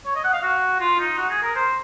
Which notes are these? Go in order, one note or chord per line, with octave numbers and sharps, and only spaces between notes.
C#5
D#5
F#5
F5
F#4
F4
D#4
F#4
G#4
A#4
C5